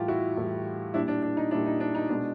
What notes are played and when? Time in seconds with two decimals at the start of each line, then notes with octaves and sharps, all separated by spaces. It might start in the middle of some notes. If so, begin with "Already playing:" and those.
Already playing: A2 E3 G3 F4 G4
0.08 E4 F#4
0.37 A2 E3 G3
0.94 A#2 G3 D4 E4
1.08 D4
1.23 D4
1.37 D#4
1.51 A#2 D4 E4
1.55 G3
1.66 D#4
1.80 D4
1.95 D#4
2.09 B2 G#3 D4